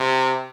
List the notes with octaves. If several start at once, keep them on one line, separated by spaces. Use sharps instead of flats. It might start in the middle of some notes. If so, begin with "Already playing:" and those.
Already playing: C3